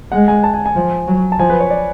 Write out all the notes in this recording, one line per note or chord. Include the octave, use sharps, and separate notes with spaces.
G#3 F#5
G#5
A5
G#5
G#5
F3
F#3
A5
F3 G#5
B4
C#5
D5